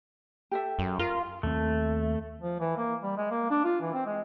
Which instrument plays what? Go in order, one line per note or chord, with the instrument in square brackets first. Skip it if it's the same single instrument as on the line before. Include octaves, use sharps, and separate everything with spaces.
[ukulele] G4 A4 E5
[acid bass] F#2
[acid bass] F4 [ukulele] A#4
[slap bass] D#2 C4 [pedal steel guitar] A3
[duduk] F3
E3
A#3
G3
G#3
A#3
D4
F4
E3
C4
G#3